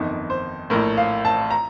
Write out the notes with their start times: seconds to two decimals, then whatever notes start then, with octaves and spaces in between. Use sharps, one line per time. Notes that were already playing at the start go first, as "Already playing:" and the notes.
Already playing: G1 F2 D#3 D#4
0.30 C5
0.70 A#1 A2 A#4
0.97 F5
1.25 A5
1.50 A#5